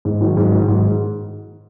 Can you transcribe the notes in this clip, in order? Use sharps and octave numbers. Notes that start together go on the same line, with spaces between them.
G#2
D#3 F#3
G#2
D#3 F#3
G#2